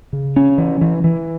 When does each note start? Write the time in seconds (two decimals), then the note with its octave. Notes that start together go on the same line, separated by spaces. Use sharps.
0.13 C#3
0.36 C#4
0.58 E3
0.81 E3
1.04 E3